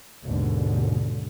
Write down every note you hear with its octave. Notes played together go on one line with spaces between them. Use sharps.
G#1 D#2 G#2 B2 D3